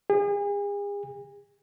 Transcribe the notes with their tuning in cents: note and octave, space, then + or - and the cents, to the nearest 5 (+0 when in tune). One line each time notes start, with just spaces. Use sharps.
G#4 -40